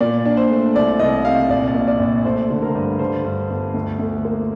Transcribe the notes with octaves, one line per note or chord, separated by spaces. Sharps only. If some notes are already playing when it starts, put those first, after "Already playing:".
A#2 D5
D4
C5
A3
C2 D5
C2 D#5
C3 F5
A#1 D5
A#2
D5
A#1
A3 C5
D3
A#4
G2
D3 C5
G2
G1
D2
D2
A#3